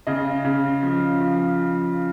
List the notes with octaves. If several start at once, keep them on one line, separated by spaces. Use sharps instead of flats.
C#3 D#5
C#3
F3
F3